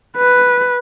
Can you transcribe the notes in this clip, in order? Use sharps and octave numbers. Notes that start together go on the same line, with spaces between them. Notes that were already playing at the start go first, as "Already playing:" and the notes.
B4